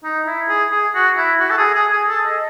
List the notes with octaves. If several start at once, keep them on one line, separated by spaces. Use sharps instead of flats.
D#4
E4
G#4
G#4
F#4
E4
F#4
A4
G#4
G#4
G#4
A4
D#5